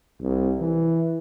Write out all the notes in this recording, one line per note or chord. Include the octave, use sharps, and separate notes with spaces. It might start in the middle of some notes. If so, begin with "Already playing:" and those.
C2
E3